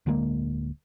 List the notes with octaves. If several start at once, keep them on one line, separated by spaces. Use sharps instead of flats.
D1 D3 G#3 A#3